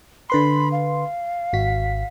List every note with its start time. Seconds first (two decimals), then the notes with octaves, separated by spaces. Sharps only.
0.30 D3 B4 B5 C6
0.72 F5
1.53 G#1 F#4 B6